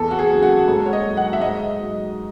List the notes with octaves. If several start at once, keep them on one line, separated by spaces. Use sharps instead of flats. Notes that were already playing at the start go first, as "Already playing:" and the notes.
Already playing: E2 A4
F#4
G#4
C#3 F#3
F#4
G#2 A4
C#5
D#5
F#3
F#5
E5
G#2 D#5
F#3